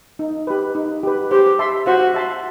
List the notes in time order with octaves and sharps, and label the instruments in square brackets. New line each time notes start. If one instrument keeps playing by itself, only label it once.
[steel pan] D#4
G4 B4
D#4
G4 B4
[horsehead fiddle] G4 [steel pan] C5
[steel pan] E5 A5 C6
[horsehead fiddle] F#4 [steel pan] C5
[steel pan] E5 A5 C6